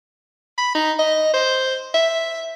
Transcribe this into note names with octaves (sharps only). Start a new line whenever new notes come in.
B5
D#4
D#5
C5
E5